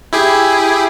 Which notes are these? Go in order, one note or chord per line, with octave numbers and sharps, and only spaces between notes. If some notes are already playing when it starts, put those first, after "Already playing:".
E4 G4 G#4